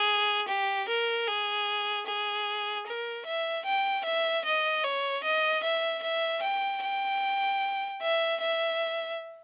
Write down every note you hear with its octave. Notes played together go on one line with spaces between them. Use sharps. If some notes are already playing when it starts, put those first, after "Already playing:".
Already playing: G#4
G4
A#4
G#4
G#4
A#4
E5
G5
E5
D#5
C#5
D#5
E5
E5
G5
G5
E5
E5